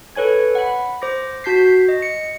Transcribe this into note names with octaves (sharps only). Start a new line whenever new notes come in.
A4 B4 C#5 G#5 G#6
F#5 B5
C5 D6 A#6
F#4 A5 G6 B6 C7
D#5
C#7